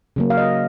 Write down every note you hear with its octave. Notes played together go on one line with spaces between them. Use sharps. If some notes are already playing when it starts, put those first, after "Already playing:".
C#3 F#3 A#3
F5
D#5